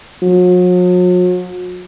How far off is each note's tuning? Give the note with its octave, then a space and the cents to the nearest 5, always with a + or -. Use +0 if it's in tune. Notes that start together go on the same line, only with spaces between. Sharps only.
F#3 -45